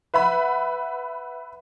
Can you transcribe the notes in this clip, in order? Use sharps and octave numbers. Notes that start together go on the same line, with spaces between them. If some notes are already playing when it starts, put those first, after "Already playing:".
B4 E5 F#5 B5